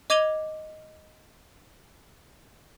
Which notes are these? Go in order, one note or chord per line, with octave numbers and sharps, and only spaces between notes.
D#5 D6 G#6 D#7 F7 G7